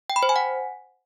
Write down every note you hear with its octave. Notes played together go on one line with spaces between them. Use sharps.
G5
B5
C5
G#5
F#5